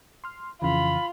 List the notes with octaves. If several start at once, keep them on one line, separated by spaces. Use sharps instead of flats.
C6 F6
F2 C#3 E3 F4 B5